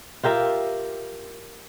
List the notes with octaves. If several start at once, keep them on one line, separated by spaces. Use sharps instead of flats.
F4 G4 A#4 E5